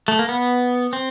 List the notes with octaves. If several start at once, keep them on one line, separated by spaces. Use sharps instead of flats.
A3
A#3
B3
C4